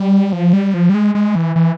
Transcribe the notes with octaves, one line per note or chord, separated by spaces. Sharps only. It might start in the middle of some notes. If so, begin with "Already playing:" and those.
Already playing: G3
F3
G3
F3
G3
G#3
G#3
E3
E3